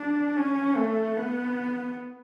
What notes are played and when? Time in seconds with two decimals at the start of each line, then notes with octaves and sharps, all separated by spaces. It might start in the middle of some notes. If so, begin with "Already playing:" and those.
Already playing: D4
0.37 C#4
0.76 A3
1.17 B3